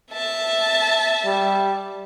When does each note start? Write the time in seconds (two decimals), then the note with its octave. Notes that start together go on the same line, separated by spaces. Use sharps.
0.12 E5 A5
1.25 G3